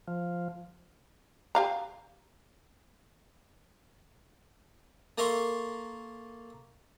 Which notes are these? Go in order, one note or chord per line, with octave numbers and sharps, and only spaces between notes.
F3
G4 F5 A#5
A#3 A4 A#4 E5 C6 C#6